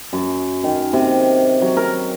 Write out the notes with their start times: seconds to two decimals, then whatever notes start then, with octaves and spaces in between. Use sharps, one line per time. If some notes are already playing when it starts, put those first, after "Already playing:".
0.13 F#2
0.64 D#3
0.93 C3
1.62 F#3
1.77 A#4